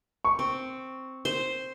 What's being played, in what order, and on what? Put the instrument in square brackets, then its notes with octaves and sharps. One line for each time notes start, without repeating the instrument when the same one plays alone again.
[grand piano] C#6
[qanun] C4
C5